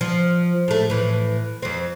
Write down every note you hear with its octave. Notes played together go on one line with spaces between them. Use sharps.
F3
A2 A3
A2 E3
F2 C4